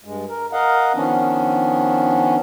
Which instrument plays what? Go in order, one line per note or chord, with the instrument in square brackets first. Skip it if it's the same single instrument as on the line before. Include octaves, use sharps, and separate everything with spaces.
[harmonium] G2 G#3
A#4
A#4 D#5 F5 F#5
D#3 F3 B3 C#4 D4